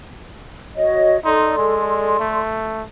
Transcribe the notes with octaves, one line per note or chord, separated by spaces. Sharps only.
F#4 C#5 D#5
D#4 A4 D5 C6
G#3
A3